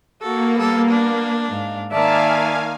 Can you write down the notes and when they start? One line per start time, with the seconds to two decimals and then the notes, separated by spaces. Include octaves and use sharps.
0.22 A#3 F#4 A4
0.59 G3 B3 A4
0.91 D4
1.48 G#2 F5
1.92 D#3 A#3 D5 E5 F5 G#5 A5